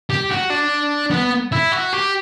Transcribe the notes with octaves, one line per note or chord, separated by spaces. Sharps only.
G4
F#4
D4
B3
E4
F#4
G4